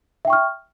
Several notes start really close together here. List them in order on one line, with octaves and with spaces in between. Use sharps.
E5 G5 C#6 F6